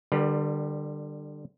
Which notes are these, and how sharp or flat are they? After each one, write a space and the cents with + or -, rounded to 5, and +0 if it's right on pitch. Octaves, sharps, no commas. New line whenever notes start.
D3 +25 G3 +0 B4 -30